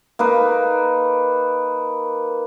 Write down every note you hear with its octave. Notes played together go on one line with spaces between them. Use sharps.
A#3 D#4 B4